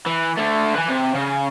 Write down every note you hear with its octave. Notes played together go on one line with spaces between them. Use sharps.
E3
D3 A3
B4 G#5
C3
C#3